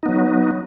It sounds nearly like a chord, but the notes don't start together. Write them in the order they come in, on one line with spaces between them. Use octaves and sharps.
D#4 B3 F#3